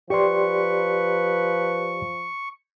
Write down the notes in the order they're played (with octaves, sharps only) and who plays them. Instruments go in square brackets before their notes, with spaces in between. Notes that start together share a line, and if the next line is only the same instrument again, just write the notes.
[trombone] F3 [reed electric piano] G4 D5 C6 [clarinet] B4 [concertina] C#6